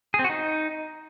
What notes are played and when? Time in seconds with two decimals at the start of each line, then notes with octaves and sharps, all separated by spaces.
0.14 G#4
0.19 C4
0.24 F#4
0.30 D#4